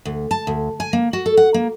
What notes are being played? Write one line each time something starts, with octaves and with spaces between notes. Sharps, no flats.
D2
A5
D2
G#5
A#3
F#4
A4
F#5
A#3